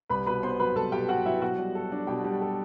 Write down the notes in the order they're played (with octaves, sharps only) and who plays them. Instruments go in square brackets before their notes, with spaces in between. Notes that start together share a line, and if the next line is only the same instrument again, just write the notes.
[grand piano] C2 [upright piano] B4 B5
[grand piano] B2 [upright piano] B4 B5
[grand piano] B3 [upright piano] C5 C6
[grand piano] F#3 [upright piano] B4 B5
[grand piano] C2 [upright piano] A4 A5
[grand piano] B2 [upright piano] G4 G5
[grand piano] B3 [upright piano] F#4 F#5
[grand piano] F#3 [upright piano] E4 E5
[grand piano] B2 [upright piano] F#4 F#5
[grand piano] G3
A4
D4
[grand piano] B2 [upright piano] G4 G5
[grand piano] G3
A4